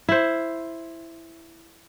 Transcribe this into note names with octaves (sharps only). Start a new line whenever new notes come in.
E4 C5